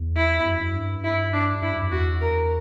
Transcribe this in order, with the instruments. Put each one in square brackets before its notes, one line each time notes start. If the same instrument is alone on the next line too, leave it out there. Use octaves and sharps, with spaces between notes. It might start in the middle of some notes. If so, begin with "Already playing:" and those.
Already playing: [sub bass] E2
[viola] E4
[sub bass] F#2
F#2
G2
[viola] E4
D4
[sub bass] G2 [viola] E4
[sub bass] F#2
F#2
[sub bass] E2 [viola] F#4
[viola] A#4